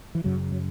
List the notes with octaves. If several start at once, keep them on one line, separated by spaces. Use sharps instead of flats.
E3
F#2 C#3 F#3
F#3